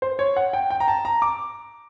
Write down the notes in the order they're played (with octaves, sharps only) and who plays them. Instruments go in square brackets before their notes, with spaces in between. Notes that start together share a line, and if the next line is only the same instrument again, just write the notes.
[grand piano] C5
C#5
F#5
G5
G5
A#5
A5
A#5
D6